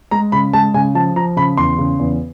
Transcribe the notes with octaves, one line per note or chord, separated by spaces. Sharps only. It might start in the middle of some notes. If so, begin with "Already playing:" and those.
G#3 A#5
C#3 B5
G#3 A5
C#3 G#5
F3 A5
F3 A#5
C#3 B5
E2 C6
C#3
E2